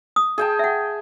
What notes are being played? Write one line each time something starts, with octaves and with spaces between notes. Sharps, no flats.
D#6
G#4 G5 A5
E5 F#5